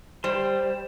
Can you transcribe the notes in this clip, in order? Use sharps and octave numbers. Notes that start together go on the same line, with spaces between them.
G3 C5 C6